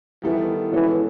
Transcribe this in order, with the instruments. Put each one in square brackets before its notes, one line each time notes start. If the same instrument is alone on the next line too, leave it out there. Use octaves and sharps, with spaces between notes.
[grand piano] D#3 G3 B3 E4 A4 [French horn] E3
[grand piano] B2 G#3 C#4 F#4 A4 [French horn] E3